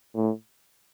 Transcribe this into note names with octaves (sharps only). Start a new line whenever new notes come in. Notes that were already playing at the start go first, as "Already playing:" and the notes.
A2